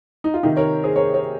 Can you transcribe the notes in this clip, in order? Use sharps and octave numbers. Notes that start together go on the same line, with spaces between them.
D#4
F4
C3 D#3 D#4 G4
A#4 C#5
G#4 C5
A#4 C#5
A#4 C#5